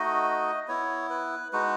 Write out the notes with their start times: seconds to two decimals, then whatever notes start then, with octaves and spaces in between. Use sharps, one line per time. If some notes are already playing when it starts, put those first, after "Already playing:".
Already playing: A3 D#4 F#4 D#5
0.68 B3 E4 C#5
1.10 B4
1.53 G#3 D#4 F#4 B4